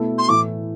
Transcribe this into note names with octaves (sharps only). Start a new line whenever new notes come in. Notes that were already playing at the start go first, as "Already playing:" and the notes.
Already playing: B2 A3 E4 A4
C6
A2 E3 A3 D6